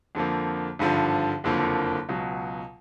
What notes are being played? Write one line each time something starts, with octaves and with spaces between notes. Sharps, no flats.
F2 D3 F3 A#3
G#1 G2 D3 F3
F#1 F2 D3 F3 A#3
C#2 B2 F#3